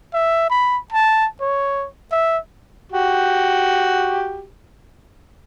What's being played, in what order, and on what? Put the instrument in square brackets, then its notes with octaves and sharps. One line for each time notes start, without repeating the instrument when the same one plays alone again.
[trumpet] E5
B5
A5
C#5
E5
[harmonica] F#4 G4